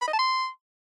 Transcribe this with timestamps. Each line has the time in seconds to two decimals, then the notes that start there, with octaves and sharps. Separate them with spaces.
0.02 B5
0.08 D#5
0.13 A5
0.19 C6